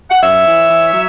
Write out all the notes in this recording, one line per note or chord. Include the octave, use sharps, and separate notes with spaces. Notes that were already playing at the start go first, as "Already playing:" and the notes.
F#5
F#2 C#5 E5
E3
E3
F#3